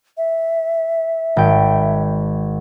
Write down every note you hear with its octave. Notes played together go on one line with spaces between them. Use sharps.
E5
G#1 G5